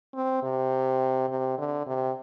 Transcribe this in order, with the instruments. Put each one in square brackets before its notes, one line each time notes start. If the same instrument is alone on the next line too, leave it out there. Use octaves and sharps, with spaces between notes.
[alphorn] C4
C3
C3
D3
C3